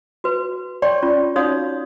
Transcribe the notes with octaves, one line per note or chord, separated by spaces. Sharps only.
F#4 B4
C#5 D5 G5 A5 C6 C#6
C#4 F4
C#4 D#4 F#4 C#5 F5 D#6